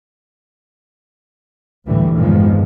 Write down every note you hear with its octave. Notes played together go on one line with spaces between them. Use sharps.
D2 A2 D3 E3 G3
E2 G2 A#2 D#3 F3 G#3